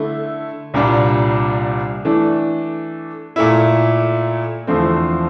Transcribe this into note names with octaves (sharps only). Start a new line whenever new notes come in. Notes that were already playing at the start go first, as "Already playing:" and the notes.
Already playing: D3 A3 E4
C2 A#2 G3 D4
E3 A3 D4
A#2 A3 E4
E2 D3 F3 A3 C4